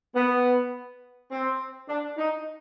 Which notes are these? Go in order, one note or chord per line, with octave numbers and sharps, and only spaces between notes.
B3
C4
D4
D#4